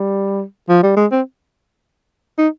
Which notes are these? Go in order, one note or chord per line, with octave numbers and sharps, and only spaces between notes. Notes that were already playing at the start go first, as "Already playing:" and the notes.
Already playing: G3
F3
G3
G#3
C4
D#4